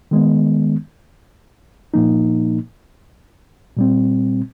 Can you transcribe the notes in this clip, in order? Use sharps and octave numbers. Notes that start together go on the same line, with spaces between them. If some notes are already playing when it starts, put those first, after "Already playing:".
D#3 G#3 B3
A#2 F3 A#3 D#4
A#2 G3 C4